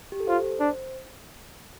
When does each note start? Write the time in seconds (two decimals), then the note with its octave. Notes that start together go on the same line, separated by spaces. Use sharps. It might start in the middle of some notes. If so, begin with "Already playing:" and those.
0.12 G4
0.20 A4
0.28 F4 C5
0.60 D4